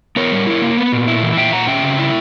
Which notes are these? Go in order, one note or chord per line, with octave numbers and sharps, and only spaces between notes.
B3 A#4 C#5
G3
E4
A#3
B3
A#2
E4
E3
A#2 E5 G5
A#2 F#5 A#5
C#4 E5 G5
C#3
E4